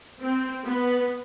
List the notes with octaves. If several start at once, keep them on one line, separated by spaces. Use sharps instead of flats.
C4
B3